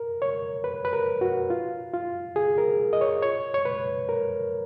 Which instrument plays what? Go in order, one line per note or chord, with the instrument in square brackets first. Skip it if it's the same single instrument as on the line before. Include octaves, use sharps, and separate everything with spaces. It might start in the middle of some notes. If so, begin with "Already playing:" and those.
Already playing: [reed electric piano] A#4
C#5
B4
B4
A#4
F#4
F4
F4
G#4
A#4
D#5
C#5
C#5
C#5
B4
A#4